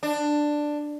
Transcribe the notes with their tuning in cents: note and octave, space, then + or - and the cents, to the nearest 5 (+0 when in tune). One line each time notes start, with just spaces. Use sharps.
D4 +10